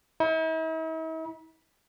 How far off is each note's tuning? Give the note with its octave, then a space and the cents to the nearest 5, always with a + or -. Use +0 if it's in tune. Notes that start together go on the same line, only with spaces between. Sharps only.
E4 -45